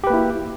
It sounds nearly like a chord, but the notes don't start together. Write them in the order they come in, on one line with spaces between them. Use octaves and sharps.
G4 B4 A#3 E4 F#4